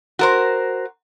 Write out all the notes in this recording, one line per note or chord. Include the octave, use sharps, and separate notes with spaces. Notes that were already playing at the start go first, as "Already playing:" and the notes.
F#4 A#4 C5